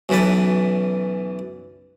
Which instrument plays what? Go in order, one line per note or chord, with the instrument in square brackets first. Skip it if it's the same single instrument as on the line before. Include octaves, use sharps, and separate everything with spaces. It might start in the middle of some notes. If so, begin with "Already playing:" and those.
[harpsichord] B1 F#2 E3 B4 A5